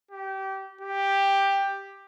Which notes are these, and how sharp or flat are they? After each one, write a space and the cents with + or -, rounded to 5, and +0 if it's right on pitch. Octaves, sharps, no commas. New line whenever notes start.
G4 -25
G4 +5